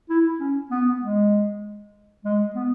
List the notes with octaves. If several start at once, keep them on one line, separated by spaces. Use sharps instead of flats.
E4
C#4
B3
G#3
G#3
B3